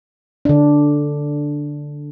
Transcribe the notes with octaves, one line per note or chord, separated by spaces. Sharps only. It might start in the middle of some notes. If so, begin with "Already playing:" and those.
D3 D4